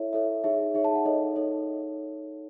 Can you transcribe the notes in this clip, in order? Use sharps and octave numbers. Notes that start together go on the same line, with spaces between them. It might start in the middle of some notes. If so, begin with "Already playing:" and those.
Already playing: E4 A4 C#5 E5
E4 A4 C#5 E5
D#4 G#4 C#5 E5
D#4 G#4 C#5 E5
A5
F#5
D#4 A4 C#5 D#5
D#4 A4 C#5 D#5